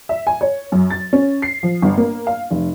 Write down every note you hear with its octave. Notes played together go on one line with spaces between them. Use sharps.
E5
G#5
C#5
F#2
A6
C#4
C7
F3
G1
A#3
F5
F1